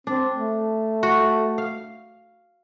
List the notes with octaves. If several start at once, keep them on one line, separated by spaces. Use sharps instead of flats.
C4 D4
A3
F#4
F5